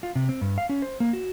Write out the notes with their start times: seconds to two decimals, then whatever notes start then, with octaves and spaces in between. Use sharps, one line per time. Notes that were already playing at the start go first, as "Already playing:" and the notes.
0.03 F4
0.15 C3
0.29 C4
0.41 G2
0.58 F5
0.69 C#4
0.82 C5
1.00 A#3
1.13 F#4